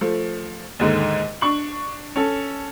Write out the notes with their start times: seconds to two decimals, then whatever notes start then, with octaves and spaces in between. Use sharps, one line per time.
0.01 F3 A3
0.79 D#2 G#2 D3
1.41 D4 C#6 F#7
2.16 C#4 A4